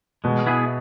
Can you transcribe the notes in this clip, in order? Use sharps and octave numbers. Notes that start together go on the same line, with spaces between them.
B2 G#3
B3 E4 G#4